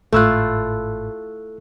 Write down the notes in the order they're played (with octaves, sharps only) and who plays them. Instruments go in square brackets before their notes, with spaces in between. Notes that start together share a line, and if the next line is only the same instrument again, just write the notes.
[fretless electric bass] G#1 A2 [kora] A3 E4 F4 [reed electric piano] A4 E6 F#6